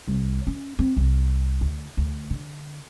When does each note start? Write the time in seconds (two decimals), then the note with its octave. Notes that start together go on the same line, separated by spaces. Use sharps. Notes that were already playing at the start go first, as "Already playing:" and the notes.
0.08 C2
0.47 C#4
0.79 C4
0.97 C2
1.61 D2
1.97 D2
2.30 D3